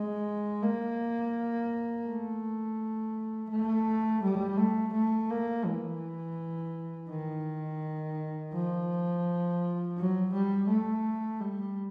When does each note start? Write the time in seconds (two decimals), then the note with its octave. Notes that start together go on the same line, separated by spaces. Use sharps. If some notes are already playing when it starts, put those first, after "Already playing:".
Already playing: G#3
0.63 A#3
2.06 A3
3.49 A3
4.23 G3
4.57 A3
4.93 A3
5.30 A#3
5.65 E3
7.10 D#3
8.54 F3
9.98 F#3
10.34 G3
10.68 A3
11.41 G3